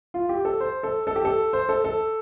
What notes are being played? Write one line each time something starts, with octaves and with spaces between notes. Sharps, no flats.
F4
G4
A4
C5
A4
A4
G4
A4
C5
A4
A4